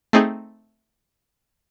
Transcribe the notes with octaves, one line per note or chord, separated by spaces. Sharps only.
A3 C4 D#4 G#4